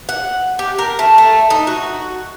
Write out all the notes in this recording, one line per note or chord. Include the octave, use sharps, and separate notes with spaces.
F#5
G4
A#4
A3
A3
D#4
F#4